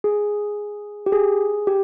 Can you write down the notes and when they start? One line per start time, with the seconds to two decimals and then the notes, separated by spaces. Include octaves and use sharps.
0.04 G#4
1.06 G4
1.12 G#4
1.67 G4